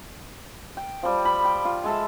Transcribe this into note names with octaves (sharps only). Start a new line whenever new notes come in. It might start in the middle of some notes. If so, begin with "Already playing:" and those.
G5
F3 G3
B5
G5
F4
G#3 A4 E5